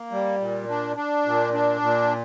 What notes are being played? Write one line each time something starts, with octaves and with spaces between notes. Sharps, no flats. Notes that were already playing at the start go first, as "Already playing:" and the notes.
Already playing: A#3
G3
A#2
D4
D4
A#2
D4
A#2